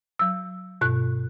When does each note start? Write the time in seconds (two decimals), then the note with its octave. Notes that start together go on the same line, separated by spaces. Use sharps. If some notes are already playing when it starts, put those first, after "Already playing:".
0.19 F#3 E6
0.81 G2 B2 F#6